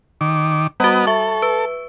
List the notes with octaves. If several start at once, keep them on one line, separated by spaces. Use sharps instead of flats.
D#3 D6
G3 B3 F#4 D#5 F#5
A4 E5 C#6
B4